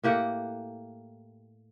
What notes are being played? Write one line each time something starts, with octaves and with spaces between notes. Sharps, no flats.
A2 A#3 G4 F#5